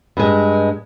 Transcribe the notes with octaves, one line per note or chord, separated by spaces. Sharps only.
G2 G#3